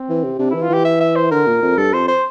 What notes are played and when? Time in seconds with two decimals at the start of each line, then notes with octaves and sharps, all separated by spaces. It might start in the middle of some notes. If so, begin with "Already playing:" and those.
Already playing: C4
0.09 E3
0.24 C3
0.39 C3 D4
0.50 E3 E4
0.62 F4
0.69 E3 G4
0.85 E5
1.00 E5
1.16 C5
1.31 D3 A#4
1.46 A#2
1.62 F2
1.77 G2 A4
1.93 F2 C5
2.08 C5